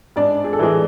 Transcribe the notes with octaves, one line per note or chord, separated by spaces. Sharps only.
G#2 D4 D5
G#4
A4
E3 G#3 G#4